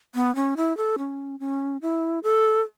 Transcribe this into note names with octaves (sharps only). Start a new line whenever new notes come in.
B3
C#4
E4
A4
C#4
C#4
E4
A4